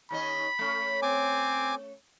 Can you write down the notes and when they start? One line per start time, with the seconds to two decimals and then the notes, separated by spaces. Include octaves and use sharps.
0.11 D#2 C#4 D#5 B5
0.59 A3 C#4
1.02 C4 G#5 D6